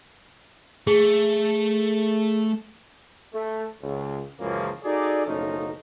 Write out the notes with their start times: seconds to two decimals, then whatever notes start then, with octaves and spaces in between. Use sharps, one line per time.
0.87 A3 G#4
3.33 A3
3.82 C#2
4.40 C#2 F#2 C#3 E3 F3 A#3
4.84 D#4 F#4 G#4 A4 D5
5.26 F#1 B1 F3 A3 C#4 D#4